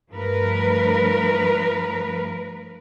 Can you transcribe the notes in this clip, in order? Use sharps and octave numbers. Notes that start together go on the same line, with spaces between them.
G2 F3 A3 A#4 B4